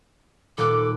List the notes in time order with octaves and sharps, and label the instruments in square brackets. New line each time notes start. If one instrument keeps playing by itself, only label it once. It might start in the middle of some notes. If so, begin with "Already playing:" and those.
[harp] D#1 A#2 F#6 [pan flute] A4 [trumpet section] D6